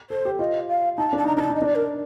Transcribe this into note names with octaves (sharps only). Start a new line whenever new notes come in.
A4 C5
G4
F4 D#5
F5
D#4 A5
D4 A5
D#4 A#5
D4 A5 A#5
D#4
D#5
D4
D5
A#4